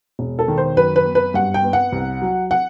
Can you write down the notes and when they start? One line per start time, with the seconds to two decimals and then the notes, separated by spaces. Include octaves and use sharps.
0.19 E1
0.39 A4
0.48 D#3
0.58 C5
0.77 F#2 B4
0.96 B4
1.06 B3
1.15 B4
1.34 G2 F#5
1.54 G5
1.64 B3
1.73 F#5
1.92 C2
2.22 F#3
2.51 F#5